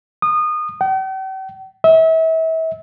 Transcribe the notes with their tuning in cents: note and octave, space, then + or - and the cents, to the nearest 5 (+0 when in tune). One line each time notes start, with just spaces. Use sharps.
D#6 -25
G5 -45
E5 -35